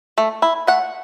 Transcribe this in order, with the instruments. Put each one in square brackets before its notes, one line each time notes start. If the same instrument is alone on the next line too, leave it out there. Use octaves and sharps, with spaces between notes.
[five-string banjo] A3
E4
A3 F#5